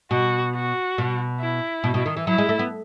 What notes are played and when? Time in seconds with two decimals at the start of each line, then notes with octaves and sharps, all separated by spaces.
0.11 B2 F#4
0.55 F#4
0.98 B2
1.40 E4
1.84 B2
1.94 B2
2.06 D#3
2.17 E3
2.27 F#3 E4
2.38 G#3
2.49 A3
2.59 B3